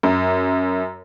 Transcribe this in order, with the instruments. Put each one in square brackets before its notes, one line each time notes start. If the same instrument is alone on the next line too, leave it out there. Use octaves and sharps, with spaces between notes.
[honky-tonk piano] F#2